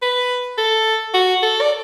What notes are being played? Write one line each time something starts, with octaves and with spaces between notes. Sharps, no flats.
B4
A4
F#4
A4
D5